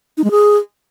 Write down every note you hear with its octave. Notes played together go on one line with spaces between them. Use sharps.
D#4
G#3
G#4